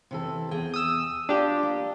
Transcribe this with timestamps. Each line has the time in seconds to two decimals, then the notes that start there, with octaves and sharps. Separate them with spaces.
0.11 C3 E3 A4
0.51 E2 G#4 G5
0.74 D#6 E6
1.29 D4 F4 G4
1.63 A#3